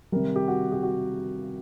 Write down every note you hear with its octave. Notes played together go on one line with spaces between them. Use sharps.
C3 D#3 G3 A#4
G4
F#4
G4
F#4